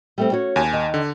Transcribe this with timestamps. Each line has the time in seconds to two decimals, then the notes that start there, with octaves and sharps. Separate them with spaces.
0.18 G3 A3 C4
0.32 C#4 F#4 C#5
0.56 D#2 G#5
0.73 D#3
0.94 D3